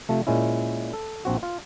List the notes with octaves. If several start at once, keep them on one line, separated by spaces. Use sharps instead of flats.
C3 F3 A3
A#2 G#3 C#4 E4
A4
A#1 C4 F#4
F4